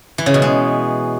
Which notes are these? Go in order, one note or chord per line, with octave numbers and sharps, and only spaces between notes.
E3
C#3
B2
G#3